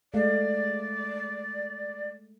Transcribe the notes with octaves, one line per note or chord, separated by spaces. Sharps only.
G#3 A3 D5 F5